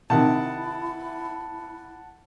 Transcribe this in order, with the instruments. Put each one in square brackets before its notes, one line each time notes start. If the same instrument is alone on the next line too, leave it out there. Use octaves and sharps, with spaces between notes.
[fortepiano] C3 D#3 [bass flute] E4 [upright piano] F#5 A5